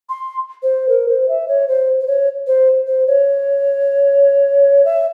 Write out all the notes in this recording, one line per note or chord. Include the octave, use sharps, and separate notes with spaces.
C6
C5
A#4
C5
E5
C#5
C5
C5
C#5
C5
C5
C#5
E5